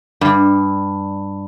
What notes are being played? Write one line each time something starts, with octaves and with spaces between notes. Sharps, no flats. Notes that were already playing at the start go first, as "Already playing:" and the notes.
G2